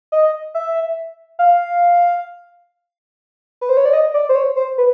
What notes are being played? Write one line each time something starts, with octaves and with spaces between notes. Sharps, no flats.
D#5
E5
F5
B4
C5
C#5
D5
D#5
D5
C5
C#5
C5
B4